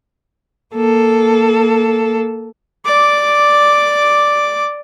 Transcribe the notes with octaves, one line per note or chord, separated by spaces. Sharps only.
A#3 A4
D5 D6